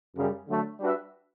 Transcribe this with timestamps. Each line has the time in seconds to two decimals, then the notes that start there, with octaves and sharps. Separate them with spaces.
0.16 F#2 C#3 G3
0.48 D3 F#3 A3
0.79 G3 D4 F#4 B4 E5